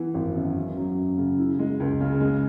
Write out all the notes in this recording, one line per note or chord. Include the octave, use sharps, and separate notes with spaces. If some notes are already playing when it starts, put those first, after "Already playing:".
Already playing: E3 B3
G#1
F#2
F#2
F#3
F#2
C#3
E4
G#3
C#2
C#3
G#3